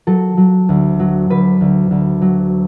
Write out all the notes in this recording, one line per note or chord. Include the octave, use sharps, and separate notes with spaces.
F#3 A4
F#3
D2
F#3
D2 B4
D2
D2
F#3